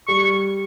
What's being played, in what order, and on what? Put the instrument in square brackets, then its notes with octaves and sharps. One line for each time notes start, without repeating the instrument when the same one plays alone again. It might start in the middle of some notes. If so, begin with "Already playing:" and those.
[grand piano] G3 [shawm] C#6
[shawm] C#6